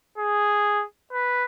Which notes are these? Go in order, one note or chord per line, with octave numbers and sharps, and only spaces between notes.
G#4
B4